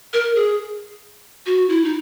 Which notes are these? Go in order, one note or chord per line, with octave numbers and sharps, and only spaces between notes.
A#4
G#4
F#4
E4
D#4